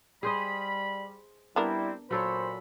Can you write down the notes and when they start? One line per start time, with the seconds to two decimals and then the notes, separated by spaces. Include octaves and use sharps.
0.23 G3 G#4 C5 D#5 B5
1.56 G3 B3 C4 D4 E4 A#4
2.11 A#2 F#3 A4 C5 C#5 B5